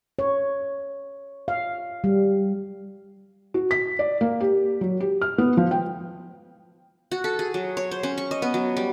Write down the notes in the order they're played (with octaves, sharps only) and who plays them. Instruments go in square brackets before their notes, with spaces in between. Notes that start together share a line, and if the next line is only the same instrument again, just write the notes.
[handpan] C#5
F5
G3
[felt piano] F#4
B6
D5
A#3
G4
F#3
G4
F6
B3
F3
G5
[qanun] F#4
A4
G#4
F#3
C#5
C5
C#4
C#6
D#5
B3
F#3
G3